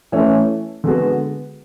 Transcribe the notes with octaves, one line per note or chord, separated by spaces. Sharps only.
E3 A3 C#4
D3 G#3 B3 F#4